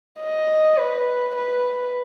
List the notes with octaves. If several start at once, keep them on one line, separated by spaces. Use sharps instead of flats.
D#5
B4
B4